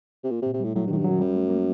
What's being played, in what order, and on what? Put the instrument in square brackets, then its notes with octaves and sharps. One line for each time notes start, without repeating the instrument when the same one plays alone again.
[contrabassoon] C3
A#2
C3
[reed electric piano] A#2
[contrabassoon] C3
[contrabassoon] A2 [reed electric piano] G3
[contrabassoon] A2 [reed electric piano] F#3
[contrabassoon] G2
[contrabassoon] A2 [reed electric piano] D#3
[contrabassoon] G2
[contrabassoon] F#2 [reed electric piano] F#3
[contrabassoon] F#2 [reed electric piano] G3
[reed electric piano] A3
A#3